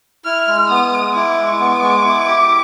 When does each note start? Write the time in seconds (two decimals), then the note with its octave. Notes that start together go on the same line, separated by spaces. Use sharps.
0.24 E4 F6
0.48 G#3
0.69 B3 D#6
0.92 G#3
1.15 E4 D6
1.37 G#3
1.60 B3
1.82 G#3
2.05 E4
2.27 G4